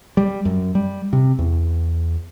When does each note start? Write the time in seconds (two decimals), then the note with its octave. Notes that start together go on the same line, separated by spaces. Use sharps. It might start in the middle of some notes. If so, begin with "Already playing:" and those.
0.17 G3
0.45 F#2
0.75 G3
1.13 C3
1.39 E2